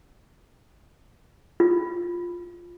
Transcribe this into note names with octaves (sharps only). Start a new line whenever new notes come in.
F4